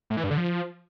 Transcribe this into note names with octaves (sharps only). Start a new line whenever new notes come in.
A2
E3
G2
D3
F3